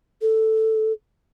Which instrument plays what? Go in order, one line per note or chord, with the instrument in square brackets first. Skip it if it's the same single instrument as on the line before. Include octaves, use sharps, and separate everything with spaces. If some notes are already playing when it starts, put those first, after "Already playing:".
[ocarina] A4